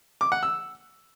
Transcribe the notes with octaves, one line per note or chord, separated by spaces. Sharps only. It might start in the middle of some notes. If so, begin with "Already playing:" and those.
D6
F#5
E6